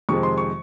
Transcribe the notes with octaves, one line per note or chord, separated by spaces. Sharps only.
F2 C3 D#3 G#3 C#6
C6
C#6